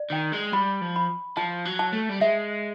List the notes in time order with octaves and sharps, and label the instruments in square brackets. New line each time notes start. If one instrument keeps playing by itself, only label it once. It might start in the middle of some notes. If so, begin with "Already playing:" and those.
Already playing: [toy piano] D5
[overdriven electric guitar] D#3 [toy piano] G5
[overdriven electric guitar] G#3
[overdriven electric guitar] G3 [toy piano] B5
[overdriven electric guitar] F3
[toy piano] B5
[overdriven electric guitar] F3 [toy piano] A5
[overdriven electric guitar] F#3
[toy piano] A5
[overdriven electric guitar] A3
G3
[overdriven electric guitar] G#3 [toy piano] E5